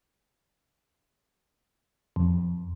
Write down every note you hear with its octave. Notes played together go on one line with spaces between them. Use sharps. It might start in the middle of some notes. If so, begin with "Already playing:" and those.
F2